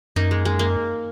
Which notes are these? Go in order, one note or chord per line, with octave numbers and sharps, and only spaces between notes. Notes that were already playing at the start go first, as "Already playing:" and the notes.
F#2 A#3 D#4
G#3
G#3
A#3